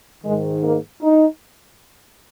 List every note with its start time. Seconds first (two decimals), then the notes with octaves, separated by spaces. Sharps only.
0.23 G#2 D#3 G#3
0.62 A#3
1.02 D#4